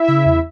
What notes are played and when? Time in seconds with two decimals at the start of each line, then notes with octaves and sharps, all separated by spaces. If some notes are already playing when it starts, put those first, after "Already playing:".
Already playing: E4 E5
0.08 C#3
0.25 E2